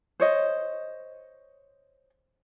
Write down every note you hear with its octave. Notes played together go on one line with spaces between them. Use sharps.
C5 C#5 D#5